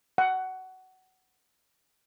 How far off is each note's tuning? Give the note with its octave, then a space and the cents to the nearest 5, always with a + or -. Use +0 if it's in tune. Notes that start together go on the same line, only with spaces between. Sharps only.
F#5 +15